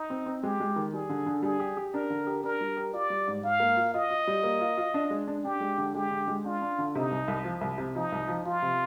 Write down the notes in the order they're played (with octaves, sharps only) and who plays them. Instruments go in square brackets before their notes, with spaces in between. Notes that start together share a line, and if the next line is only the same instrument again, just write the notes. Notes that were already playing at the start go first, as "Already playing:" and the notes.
Already playing: [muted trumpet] D#4
[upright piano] C4
C4
[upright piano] G#3 [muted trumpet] G4
[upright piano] G#3
D#3
[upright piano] G3 [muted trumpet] G#4
[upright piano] D3
D3
[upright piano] G3 [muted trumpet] G#4
[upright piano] G4
G4
[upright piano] D4 [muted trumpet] A#4
[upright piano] D3
G4
[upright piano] D4 [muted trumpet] A#4
[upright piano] G3
G4
[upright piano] F4 [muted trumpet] D5
[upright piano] G3
G#2
[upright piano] G#2 [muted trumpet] F5
[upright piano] A#3
F4
[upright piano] F4 [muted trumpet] D#5
[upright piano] F4
G3
A#3
F4
F4
D4
G#3
D4
[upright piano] D4 [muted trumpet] G4
[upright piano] G#3
D3
[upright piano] G#3 [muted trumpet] G4
[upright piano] D3
G#3
[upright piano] D4 [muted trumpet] F4
[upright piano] D4
D3
[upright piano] C3 [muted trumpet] D#4
[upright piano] C2
C2
F3
C2
C3
[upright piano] F3 [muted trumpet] D#4
[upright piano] C2
F3
[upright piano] F3 [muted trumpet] F4
[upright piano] C3